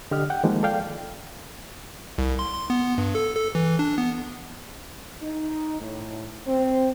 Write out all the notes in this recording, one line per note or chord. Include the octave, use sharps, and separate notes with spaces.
D3 G4 D5 D#5 F6
F#5 G5
D#3 F3 G#3 A#3
A4 D5 F5 G5
C2
C6
C6
B3
G2
A4
A4
E3
D4
B3
D#4
A2
C4